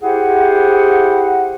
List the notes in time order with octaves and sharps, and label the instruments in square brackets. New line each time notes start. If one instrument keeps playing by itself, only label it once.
[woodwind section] E4 G4 G#4 C5 F#5